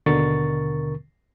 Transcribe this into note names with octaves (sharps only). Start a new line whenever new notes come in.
D#2 B2 D3 A#4 C#6 A6